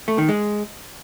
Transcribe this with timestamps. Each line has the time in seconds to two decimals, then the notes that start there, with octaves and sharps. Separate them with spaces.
0.08 A3
0.18 D#3
0.29 G#3